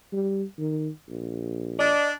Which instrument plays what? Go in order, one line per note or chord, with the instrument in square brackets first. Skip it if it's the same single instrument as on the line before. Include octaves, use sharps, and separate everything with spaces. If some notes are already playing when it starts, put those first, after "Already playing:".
[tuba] G3
D#3
A#1
[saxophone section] D4 D#5